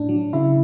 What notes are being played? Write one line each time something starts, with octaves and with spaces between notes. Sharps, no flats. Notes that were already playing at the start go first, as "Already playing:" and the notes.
Already playing: A2 D4
F#3
C#3 E4